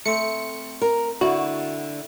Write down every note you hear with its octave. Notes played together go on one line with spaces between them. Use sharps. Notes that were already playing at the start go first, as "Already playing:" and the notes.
A3 C4 C#7
A#4
D3 E4 F#4